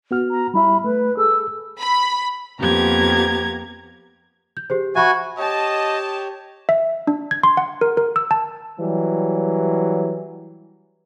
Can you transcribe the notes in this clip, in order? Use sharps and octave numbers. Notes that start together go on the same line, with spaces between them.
B3 F#4 F6
A#5
G3 E4 E5 B5
A3 B4
G#4 A4 E6
B5
F2 A#3 B3 G4 A#5 G#6
G6
G4 G#4 C5
F#4 E5 G#5 B5 C#6
G4 C#5 D#5 A5
E5
D4
G#6
C6
F#5
A#4
A#4
E6
A5
E3 F#3 G3